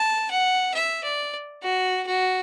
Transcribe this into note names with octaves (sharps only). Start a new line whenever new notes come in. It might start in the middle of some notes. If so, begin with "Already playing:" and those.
Already playing: A5
F#5
E5
D5
F#4
F#4